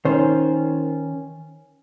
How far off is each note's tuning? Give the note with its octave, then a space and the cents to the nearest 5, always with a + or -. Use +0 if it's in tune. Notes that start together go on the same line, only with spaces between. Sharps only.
D#3 +20 C#4 +0 C5 +0